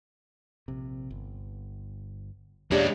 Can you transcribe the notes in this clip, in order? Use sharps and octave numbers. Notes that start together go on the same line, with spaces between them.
A#1 C3
G1
E2 G#3 A#3 C#4 D4 G4 C#5 D5